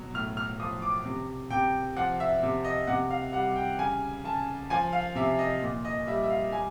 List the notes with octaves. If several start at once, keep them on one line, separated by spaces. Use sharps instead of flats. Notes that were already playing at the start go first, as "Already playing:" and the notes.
Already playing: B2 F#3
A2 F6
F6
F3 D#6
D6
C3
C3 G5
F3 F#5
E5
C3
D#5
C3 F#5
F5
G3 F#5
G5
C#3 G#5
C#3 A5
F3 G#5
F5
C3 E5
D#5
A#2
D#5
G3 E5
E5
F5
G3 G#5